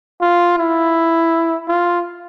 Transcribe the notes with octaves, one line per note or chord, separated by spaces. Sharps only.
F4
E4
F4